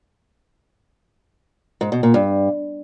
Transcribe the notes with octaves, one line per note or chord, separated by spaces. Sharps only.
G#2
B2
A#2
G2